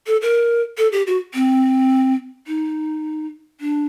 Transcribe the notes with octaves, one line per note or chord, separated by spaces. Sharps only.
A4
A#4
A4
G4
F#4
C4
D#4
D4